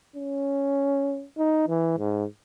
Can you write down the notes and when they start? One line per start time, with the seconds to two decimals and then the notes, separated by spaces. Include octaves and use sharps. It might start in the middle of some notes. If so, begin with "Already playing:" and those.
0.16 C#4
1.37 D#4
1.68 E3
1.98 G#2